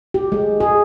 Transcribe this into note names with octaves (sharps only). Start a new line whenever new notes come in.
G4
G#3
G#4